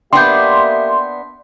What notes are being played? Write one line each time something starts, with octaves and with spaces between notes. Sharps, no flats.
A#3 B3 D4 G4 E5 G5 C6 G6